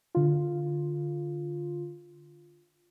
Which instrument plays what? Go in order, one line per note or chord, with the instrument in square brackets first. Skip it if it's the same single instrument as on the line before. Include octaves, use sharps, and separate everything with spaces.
[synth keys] D3 F4